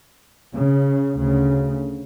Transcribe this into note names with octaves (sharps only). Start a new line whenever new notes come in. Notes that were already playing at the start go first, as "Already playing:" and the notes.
C#3
D2 C#3